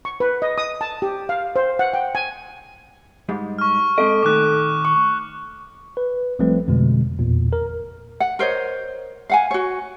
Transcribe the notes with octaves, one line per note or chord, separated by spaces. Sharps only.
C#6
B4
D#5
D#6
A5
G4
F5
C5
F#5
G5
G#5
G#2 G3 G#3
C#6 F6
G#3 C4 A4 D#5 D7
A#2 D#3 A3 D6 F#6
C#6
B4
A1 F3 G3 A3 C4 B4
F2 B2 D3 G#3
G#1 E2 A#2
A#4
F#5
A#4 C5 C#5 D#5
F5 F#5 G#5
F#4 C#5